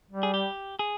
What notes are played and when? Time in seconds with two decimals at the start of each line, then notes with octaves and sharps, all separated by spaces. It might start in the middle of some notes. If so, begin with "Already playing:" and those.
0.11 G3
0.23 G#4
0.34 G4
0.79 G#4